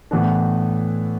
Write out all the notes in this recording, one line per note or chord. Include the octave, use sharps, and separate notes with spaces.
A2 E3 B3 D4